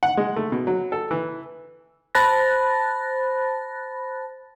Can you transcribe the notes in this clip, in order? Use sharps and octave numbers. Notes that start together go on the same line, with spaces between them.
F#5
G#3
A3
B2
F#3
A4
E3
C5 A5 B5 F#6 A6 A#6